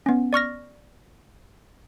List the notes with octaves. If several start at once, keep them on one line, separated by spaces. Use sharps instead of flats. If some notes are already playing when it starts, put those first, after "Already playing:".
B3 C#4
D5 C#6 F6 A#6